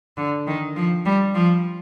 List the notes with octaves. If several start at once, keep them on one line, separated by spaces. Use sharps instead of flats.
D3
D#3
F3
G3
F3